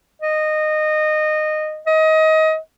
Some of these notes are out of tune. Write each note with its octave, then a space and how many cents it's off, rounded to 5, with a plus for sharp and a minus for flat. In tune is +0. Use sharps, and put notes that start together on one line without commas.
D#5 -20
D#5 +25